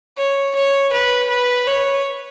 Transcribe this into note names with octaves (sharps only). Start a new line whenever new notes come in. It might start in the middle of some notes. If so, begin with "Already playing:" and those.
C#5
C#5
B4
B4
C#5